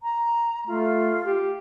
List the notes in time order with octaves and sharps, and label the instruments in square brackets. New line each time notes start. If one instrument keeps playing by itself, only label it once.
[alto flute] A#5
[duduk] A3 [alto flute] F4
[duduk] G4